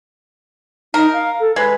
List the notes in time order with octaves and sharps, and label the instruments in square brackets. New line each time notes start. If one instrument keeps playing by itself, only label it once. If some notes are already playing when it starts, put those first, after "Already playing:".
[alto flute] D#4 [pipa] A#4
[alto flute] F5
A4
[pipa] G#3 [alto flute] B4